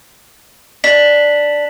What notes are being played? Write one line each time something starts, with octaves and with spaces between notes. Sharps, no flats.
D4 B6 F#7